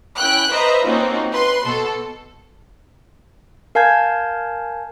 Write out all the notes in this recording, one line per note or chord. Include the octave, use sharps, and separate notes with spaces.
C#4 E4 G5 F#6
B4 C5 D#5 E5 A#5
A#3 C4 C#4 D#4 F4 F#4
B4 C6
B2 A4
A#4 F5 G#5 A5 G6 G#6